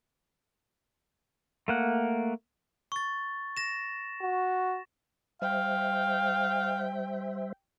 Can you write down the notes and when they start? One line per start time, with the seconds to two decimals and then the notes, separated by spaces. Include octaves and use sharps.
1.68 A3 A#3 F#5
2.92 C#6 A6
3.57 A#6 E7
4.22 F#4
5.42 G3 C5 E5 F5 G5